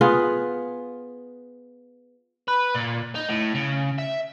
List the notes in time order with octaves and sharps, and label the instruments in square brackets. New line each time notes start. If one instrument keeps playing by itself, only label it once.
[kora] B3 F4 G#4
[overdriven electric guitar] B4
A#2
D#4
A2
C#3
E5